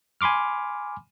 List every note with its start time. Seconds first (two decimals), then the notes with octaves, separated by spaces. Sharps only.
0.21 G#5 B5 C6 D6 F6